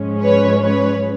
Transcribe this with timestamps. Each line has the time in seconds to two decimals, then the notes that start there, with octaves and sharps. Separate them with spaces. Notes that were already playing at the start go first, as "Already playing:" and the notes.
Already playing: G#2 F3 G#3 C#4
0.22 B4 C#5
0.61 B4 C#5